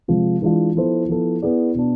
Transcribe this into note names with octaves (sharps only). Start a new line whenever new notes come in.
C3 F3 G#3
E3 G#3 D4 F4
F3 B3 E4 A4 C5
F3 B3 E4 A4
B3 E4 G#4 D5
B2 B3 D4